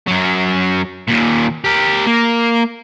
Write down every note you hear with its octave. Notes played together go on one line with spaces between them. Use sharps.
F#2 F#3
D#2 A#2
G4 A#4
A#3